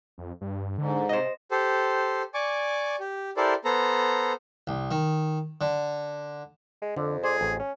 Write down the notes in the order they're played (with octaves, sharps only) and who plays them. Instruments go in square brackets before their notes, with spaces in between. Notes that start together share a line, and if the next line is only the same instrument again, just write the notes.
[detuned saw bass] F2
G2
[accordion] G#2 [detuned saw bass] D3
[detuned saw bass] C3 [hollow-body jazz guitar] C5 D#5
[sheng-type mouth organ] G4 A4 C5
D5 G#5 C#6 D6
G4
E4 G4 A4 A#4 C5 D5
B3 A4 C5 A#5
[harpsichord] C2
D#3
D3
[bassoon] G#3
[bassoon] F2 [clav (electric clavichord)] D3
[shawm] G#4 [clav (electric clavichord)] C5 D5
[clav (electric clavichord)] A1
[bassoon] C#4